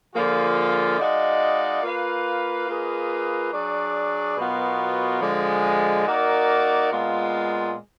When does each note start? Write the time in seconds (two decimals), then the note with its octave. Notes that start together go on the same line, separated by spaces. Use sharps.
0.13 D3 F3 A#3 F4 G#4
0.98 G#3 D#4 F#4 D5 F5
1.82 A#3 F4 B4 F5
2.67 A#3 F4 G#4 B4 D#5
3.52 F#3 D4 G#4 D5
4.37 B2 F#3 B3 F4 A#4
5.21 D3 F3 G#3
6.06 A#3 D#4 F#4 A#4 D5
6.91 A#2 G#3 B3 F4